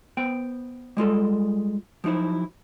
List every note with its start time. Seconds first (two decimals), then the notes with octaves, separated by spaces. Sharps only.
0.17 B3 C5 G5
0.97 G3 G#3 F4 A4
2.04 F3 F#3 D#4 E4 C5